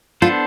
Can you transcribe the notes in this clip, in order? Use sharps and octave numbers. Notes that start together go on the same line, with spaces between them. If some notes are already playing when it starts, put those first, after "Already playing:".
B3 D4 F4 A4 C5